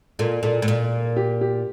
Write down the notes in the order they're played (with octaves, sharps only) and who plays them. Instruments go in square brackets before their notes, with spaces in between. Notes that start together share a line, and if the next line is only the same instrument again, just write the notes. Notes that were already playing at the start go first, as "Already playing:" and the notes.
[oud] A#2 [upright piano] A4
[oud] A#2 [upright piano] A4
[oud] A2
A#2
[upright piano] G4
G4